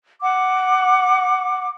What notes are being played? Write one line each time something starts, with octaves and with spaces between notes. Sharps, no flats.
F#5 D6